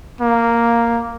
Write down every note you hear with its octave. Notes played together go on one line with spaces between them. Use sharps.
A#3